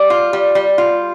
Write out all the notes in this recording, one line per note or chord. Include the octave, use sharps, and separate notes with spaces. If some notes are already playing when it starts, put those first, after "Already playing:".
Already playing: G3
F4
G3
G3
F4